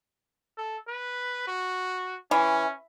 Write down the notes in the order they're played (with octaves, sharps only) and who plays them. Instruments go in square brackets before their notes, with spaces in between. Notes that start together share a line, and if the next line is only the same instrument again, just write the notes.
[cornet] A4
B4
F#4
[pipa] E3 [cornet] C#4